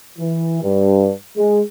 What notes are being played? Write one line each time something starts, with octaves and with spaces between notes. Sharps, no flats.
E3
G2
G#3